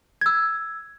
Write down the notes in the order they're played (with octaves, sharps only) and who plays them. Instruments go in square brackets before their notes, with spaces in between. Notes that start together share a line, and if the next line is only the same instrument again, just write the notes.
[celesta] E6 G#6